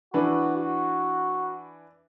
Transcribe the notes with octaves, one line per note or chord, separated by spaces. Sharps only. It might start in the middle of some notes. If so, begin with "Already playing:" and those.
E3 D4 F#4 B4
F#4